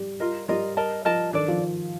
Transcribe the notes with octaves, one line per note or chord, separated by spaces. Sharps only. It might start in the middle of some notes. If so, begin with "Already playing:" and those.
Already playing: G3
F4 A#4 D#5
G3 F4 A#4 D#5
A#4 D#5 A5
F3 A#4 D#5 A5
D#3 D4 A4 D5
F3